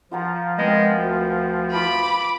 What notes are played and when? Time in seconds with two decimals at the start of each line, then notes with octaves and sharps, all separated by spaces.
0.11 F3 F4 F#5 A#5
0.58 G#3 B3 C4 A#4
0.95 D2
1.72 F4 A5 B5 D6 D#6